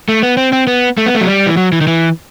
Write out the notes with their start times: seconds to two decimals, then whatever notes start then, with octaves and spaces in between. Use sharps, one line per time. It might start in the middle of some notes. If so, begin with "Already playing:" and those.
0.09 A3
0.23 B3
0.37 C4
0.53 C4
0.67 B3
0.97 A3
1.06 B3
1.15 A3
1.21 F#3
1.27 G3
1.47 E3
1.57 F#3
1.72 E3
1.81 D#3
1.87 E3